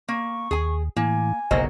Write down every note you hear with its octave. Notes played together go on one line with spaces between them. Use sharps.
A#3 C#6
D#2 G#4 G#5
A2 E3 A#3 G#5
F#1 B1 C3 F#3 A#3 C5 D#5